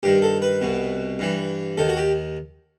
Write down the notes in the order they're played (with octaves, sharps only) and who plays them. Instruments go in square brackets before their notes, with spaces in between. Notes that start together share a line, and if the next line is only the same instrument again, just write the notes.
[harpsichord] G2 D#3 G4
A4
B4
C2 B2
G2 E3
D#2 D#3 A4
F#4
G4